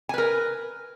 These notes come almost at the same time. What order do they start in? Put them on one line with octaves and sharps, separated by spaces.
G#5 B4 A#4